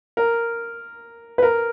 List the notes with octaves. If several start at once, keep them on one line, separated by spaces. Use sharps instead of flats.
A#4
B4
A#4